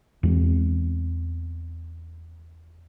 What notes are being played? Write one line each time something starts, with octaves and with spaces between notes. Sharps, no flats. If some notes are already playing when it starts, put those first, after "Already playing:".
E2 G#3 C4